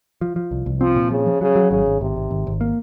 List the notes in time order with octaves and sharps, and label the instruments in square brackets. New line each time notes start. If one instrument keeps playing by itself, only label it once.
[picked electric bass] F3
F3
C2
C2
[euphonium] F3 [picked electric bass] C4
[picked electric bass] A#2
[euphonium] C#3 [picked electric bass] F3
[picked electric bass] F3
[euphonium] C#3 [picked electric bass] F#3
[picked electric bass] F#3
[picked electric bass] G#1 [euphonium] C#3
[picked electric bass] G#1
[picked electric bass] G#1 [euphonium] C3
[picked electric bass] G#1
G#1
G#1
A#3